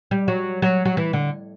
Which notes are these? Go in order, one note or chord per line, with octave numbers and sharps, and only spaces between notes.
G3
F#3
F#3
F#3
E3
D3